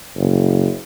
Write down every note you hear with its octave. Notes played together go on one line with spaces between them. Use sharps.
F#1